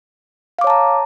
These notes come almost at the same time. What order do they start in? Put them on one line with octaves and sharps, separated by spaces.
F5 D6 C#5 A5 A#5